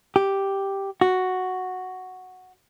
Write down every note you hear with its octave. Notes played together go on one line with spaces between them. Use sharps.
G4
F#4